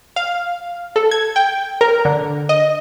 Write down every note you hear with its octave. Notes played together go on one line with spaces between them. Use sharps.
F5
A4
G#6
G5
A#4
D3
D#5